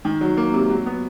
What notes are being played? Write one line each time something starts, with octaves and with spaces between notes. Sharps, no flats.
D#3
F#3
A#3
C3
F#3
B3